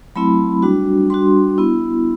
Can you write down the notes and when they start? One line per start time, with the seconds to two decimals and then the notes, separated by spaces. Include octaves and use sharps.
0.16 F#3 A3 C4 E4 B5
0.62 G3 D4 F#4
1.10 G3 D4 F#4 C6
1.58 B3 E4